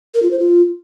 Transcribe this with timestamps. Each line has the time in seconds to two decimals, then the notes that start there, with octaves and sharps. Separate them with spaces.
0.14 A#4
0.23 F4
0.31 C5
0.39 F4